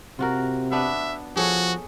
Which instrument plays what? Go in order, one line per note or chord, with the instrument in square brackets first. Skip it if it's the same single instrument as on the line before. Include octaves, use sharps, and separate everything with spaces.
[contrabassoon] C3 [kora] F4 F#4 A#4
[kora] B3 D4 B4 [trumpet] E5
[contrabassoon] F3 [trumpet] F#4 [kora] G#4 A4 C#5